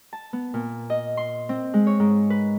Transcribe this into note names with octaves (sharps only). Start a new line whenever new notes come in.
A5
B3
A#2
D#5
C6
C4
G#3
C#5
G#2
B4